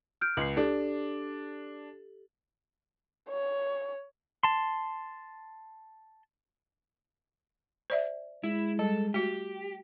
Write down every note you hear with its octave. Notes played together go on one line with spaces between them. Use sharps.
F6 G6 D7
C#2 C7 F#7
D4 G4 A4
C#5
A5 C6
C5 D5 E5
G#3 E4
G3 A4
A3 F#4 G4